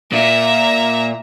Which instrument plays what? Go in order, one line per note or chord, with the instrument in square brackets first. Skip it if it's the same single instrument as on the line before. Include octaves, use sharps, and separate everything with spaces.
[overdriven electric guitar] A#2 [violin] E5 A#5